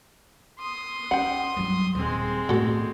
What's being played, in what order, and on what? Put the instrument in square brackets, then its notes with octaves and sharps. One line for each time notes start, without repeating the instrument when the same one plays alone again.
[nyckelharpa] C6 D#6
[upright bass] C#4 [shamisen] F#5 G5
[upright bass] G2 F#3
[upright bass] D#1 [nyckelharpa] G#3 C4
[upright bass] A2 B3 [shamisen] F#4 A4